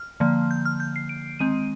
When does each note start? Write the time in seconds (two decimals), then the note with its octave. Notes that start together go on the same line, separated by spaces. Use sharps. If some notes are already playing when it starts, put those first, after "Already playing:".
Already playing: F6
0.20 D3 F3 A#3
0.51 G6
0.65 F6
0.80 G6
0.96 C7
1.09 D7
1.39 D#3 G#3 C4 D#7